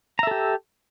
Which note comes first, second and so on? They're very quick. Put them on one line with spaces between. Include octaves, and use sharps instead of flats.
A#5 E5 A4 G4